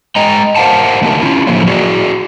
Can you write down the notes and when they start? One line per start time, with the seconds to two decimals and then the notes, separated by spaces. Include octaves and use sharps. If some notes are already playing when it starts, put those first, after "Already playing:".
0.16 G#3 D#5 G5 A#5
0.56 G4 A#4 C5 F5 F#5 A5
1.02 D#3 A3 D#4 G4 A#4
1.22 C#4 E4 F4
1.47 A2 D3 F3 F#3 A3 A#3
1.67 E4 F#4 G#4 D5